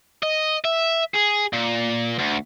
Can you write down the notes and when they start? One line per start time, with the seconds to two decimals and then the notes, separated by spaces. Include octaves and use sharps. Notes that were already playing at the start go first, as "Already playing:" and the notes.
0.23 D#5
0.65 E5
1.14 G#4
1.53 A#2
2.19 D2